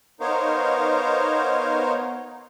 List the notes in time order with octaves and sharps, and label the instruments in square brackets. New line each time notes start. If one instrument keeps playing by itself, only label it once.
[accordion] B3 D#4 A#4 C5 C#5 F5